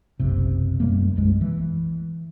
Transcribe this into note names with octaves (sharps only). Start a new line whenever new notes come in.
F#1 B1 C3
F#2 G3 A3 A#3
B1 F#2 G#3
E3